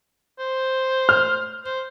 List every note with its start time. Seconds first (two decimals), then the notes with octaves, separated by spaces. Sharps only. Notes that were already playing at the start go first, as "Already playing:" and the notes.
0.39 C5
1.09 F6
1.65 C5